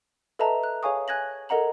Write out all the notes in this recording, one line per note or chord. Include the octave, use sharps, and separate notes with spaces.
A4 B4 D#5 E5 A5 A#5
F#6
G#4 C#5 F5 G#5 C#6 D#6
G#5 F#6 G#6 A#6 F#7
A4 A#4 D#5 F#5 A#5 F#7